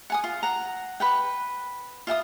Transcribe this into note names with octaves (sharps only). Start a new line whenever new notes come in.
F#5 G#5 D#6
F4
F#5 A#5
B4 F#5 G5
F4 E5 G5 D#6